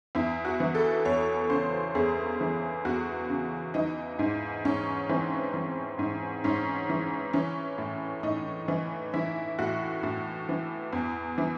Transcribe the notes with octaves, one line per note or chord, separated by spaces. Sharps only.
E2 E4
F#4
E3
A4
E2 C#5
C#3 C5
E2 G#4
E3
E2 F#4
C#3
E3 D#4
G#2
G#2 C#4
E3 C4
E3
G#2
G#2 C#4
E3
E3 C#4
A2
A2 D#4
E3
E3 E4
A2 F#4
A2
E3
E2
E3